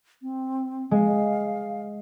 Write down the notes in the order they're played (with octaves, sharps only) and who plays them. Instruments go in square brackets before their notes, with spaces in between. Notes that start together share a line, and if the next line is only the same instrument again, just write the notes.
[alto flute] C4
[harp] G#3 [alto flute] F5